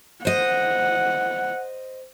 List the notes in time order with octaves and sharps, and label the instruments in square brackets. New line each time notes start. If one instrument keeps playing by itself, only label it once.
[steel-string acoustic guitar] C5 D#5 [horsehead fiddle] F#5